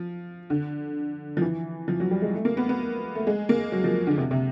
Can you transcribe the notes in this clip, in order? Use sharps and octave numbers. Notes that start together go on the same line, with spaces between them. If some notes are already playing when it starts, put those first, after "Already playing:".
Already playing: F3
D3
F3
E3
F3
F#3
G3
G#3
A3
A#3
B3
B3
A3
G#3
A#3
F#3
F3
D3
C3
C3